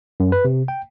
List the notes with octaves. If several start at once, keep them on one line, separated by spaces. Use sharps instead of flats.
F#2
B4
C3
G5